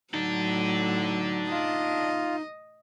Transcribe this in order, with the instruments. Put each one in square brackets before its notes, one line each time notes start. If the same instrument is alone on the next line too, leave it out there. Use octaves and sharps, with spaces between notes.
[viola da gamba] A2 F#3 [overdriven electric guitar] D4 A4 [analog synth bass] D#4
[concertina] F4 [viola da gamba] D#5